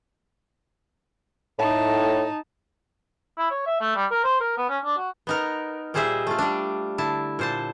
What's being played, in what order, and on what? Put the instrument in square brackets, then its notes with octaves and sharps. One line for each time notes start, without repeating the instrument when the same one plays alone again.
[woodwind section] A2 [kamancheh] D#4 A5
[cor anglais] E4
C#5
E5
A3
G3
A#4
C5
A#4
B3
C#4
D4
F#4
[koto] B3 D#4 A#4
A#2 G3 G#4 C5 D#5 E5
A3 F4
G3 D4
D3 E4 A5
A#2 C5 A5